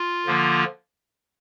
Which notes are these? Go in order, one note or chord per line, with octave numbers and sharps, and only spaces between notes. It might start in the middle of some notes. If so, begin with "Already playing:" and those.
Already playing: F4
D3 F3 A#3